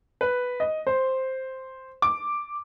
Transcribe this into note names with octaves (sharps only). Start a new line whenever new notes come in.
B4
D#5
C5
D6